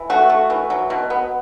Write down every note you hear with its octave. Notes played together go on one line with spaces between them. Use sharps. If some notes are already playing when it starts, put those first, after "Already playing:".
Already playing: E3
A3 F#4
A3
E3
F#3
B2
B3